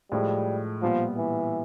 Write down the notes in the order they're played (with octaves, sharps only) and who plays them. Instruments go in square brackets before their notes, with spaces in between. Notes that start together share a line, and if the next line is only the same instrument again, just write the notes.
[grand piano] A2 F3 G#3 [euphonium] G3
[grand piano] A#2 G3 B3 [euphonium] F3
[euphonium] E3